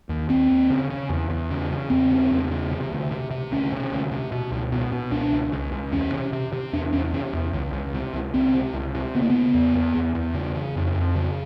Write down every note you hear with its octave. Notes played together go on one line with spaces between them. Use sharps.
D#2
D#2 C4
D#2
C#3
C#3
E2
E2
C#3
C#3
E2 C4
C#3
E2
C#3
C3
D2
C3
C3
D2 C#4
C3
D2
C3
B2
C#2
B2
B2
C#2 D4
C#2
C#2
C#2
E2 C#4
C3
C3
C3
E2 D4
E2 C#4
C3 C#4
E2
C#2
C#2
C3
C#2
C#2 C4
C3
C#2
C3
C#3 B3
A#3
C#3 B3
E2
E2
E2
E2
C#3
C#3
F2
F2
C#3